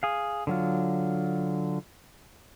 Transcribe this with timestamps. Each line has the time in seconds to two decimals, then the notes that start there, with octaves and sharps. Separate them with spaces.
0.03 G#4 F5
0.47 D3 F#3 F4